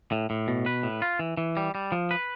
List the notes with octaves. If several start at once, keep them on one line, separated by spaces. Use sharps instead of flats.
A2
A2
B2
B4
A2
F4
E3
E3
G3
G3
F3
B4